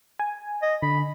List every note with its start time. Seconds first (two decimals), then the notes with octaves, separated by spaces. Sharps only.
0.19 G#5
0.62 D#5
0.83 D3 B5